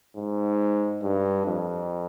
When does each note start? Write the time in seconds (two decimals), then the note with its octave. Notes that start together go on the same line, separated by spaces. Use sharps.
0.16 G#2
1.02 G2
1.45 F2